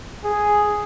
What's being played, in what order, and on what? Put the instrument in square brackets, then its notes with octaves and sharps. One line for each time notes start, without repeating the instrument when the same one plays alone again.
[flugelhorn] G#4